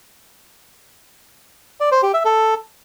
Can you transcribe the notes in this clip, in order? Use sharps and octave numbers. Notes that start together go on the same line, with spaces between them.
D5
C5
G4
E5
A4